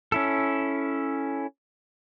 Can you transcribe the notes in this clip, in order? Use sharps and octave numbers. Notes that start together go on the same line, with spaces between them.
C#4 E4 A4